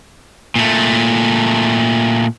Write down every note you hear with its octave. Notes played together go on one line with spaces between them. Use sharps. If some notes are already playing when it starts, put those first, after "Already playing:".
A#2 A3